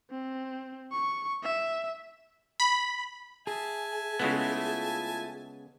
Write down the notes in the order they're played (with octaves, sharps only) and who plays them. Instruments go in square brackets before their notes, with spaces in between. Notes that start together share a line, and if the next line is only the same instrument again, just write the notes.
[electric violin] C4
C#6
E5
[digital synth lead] B5
[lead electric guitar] G#4 [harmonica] E5 G#5 A5
[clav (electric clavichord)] C#3 G#3 B3 [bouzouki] A3 E4 F4